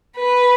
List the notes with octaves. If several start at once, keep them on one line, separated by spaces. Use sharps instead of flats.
B4